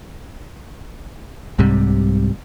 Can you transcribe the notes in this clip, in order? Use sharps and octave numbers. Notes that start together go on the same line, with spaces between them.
C2 G#2 C3 G3